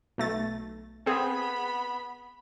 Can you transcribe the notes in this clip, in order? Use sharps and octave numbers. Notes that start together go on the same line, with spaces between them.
B1 A3 A6
B3 C4 G#4 B5